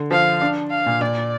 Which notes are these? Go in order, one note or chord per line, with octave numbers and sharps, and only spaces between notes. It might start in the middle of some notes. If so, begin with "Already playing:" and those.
Already playing: D3
F3 F5
D4
F5
A#2
A#2 D5